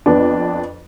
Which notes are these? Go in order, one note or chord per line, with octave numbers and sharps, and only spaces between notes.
F2 B3 D4